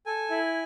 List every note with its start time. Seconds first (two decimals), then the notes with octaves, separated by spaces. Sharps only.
0.06 A4 G#5
0.30 E4